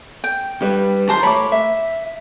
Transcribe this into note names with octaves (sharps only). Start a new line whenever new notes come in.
G5
G3 B4
D#3 F#3 G4 C5 A5 A#5
A2 C#5 B5 D6
E5